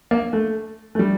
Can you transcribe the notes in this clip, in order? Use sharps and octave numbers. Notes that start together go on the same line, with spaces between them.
A#3
A3
A3
G3